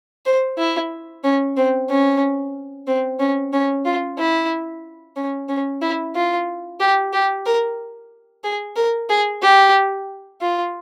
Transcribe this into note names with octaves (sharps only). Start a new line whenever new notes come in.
C5
E4
C#4
C4
C#4
C4
C#4
C#4
F4
E4
C#4
C#4
E4
F4
G4
G4
A#4
G#4
A#4
G#4
G4
F4